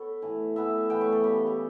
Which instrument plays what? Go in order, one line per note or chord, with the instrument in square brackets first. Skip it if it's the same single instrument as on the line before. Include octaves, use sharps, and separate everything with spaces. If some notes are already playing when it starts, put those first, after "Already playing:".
Already playing: [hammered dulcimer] B3 A4 B4 C#5
A2 E3 A3
A2 E3 B3 E5
A2 E3 B3 G5
C#5
A4
C#3 G3 B3 G4
G4